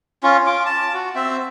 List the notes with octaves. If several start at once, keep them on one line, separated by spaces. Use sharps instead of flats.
C#4 F4
F4 D6
A5
F#4
C4 E5